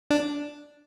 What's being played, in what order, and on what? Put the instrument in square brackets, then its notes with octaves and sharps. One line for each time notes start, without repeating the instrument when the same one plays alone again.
[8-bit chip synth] D4